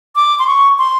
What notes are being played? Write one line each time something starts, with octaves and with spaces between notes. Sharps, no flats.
D6
C6
C#6
C6